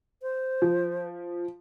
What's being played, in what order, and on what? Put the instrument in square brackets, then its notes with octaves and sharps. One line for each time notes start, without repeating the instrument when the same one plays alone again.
[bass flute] C5
[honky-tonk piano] F3